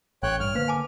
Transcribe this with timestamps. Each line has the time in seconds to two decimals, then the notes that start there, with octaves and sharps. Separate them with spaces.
0.23 A1 C#5 G5 F#6
0.40 G2 F6
0.55 D3 A#3 B4 C5 F5
0.68 G#5 A5 D6